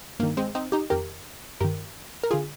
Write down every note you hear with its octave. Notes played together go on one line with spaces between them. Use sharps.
G2 D#3 A#3
G#3 C4
C4 D#4
D#4 G4
F2 D#3 G4 A#4
G2 D#3 G4 A#4
A#4
D3 F4 G#4